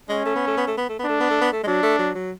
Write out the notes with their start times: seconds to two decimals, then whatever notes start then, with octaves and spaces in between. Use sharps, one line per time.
0.09 G#3 C#4
0.25 A3
0.36 B3
0.47 A3
0.57 B3
0.67 A3
0.77 B3
0.89 A3
0.99 B3
1.04 A3 D4
1.20 B3
1.30 A3
1.41 B3
1.52 A3
1.63 G#3
1.67 F#3 D4
1.83 A3
1.99 F#3
2.15 F#3